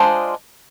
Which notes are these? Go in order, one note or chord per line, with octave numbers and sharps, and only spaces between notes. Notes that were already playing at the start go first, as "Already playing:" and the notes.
Already playing: G#3 D4 F4 C5 D#5